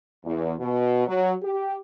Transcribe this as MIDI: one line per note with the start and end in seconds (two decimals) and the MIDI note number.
0.24 0.55 40
0.60 1.07 47
1.08 1.33 54
1.43 1.76 67